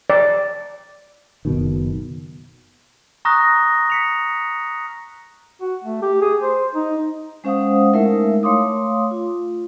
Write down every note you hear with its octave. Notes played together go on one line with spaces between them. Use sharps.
D5
F#1 B2 D#3
A#5 C#6 D#6 F6 F#6 A#6
B6 C#7 F7
F#4
A3
G4
G#4
C5
D#4
G#3 C#4 C5 F5 F#5 D#6
G#3 A3 D#4 E4 A#4 E5
A3 C#5 F5 C6 D6 D#6
F4